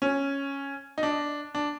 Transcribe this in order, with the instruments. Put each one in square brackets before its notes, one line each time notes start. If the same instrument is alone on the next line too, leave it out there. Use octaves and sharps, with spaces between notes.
[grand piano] C#4
D#4
D4
D4